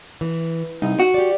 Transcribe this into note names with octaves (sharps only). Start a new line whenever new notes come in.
E3
C2 D#4
F#4
G4 D5